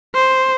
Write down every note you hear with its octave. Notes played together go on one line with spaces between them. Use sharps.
C5